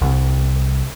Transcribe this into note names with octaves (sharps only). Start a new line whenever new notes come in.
C2